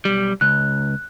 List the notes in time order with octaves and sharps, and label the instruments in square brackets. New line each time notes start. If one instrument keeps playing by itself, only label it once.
[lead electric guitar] B1 G3
[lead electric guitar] C#2 [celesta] F#6